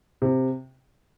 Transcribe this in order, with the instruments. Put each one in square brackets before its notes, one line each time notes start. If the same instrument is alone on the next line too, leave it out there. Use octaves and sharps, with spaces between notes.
[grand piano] C3